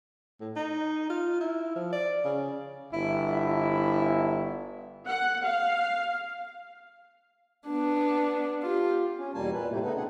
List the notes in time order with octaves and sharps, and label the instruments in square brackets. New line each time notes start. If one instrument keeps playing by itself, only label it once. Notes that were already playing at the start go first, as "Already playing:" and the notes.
[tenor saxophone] A2
D#4
F4
E4
F3
D5
C#3
[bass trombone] G1 [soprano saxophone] E4
[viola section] F#5
F5
[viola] B3 D4
F4 G4
[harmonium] C#4
E2 B2 G3 A#3 G#5 A5
A#2 B4
A2 C3 E3 G3 A3 A#3
C#3 A3 B3 D#4 A4 B4
C4 D4 G#4 F#5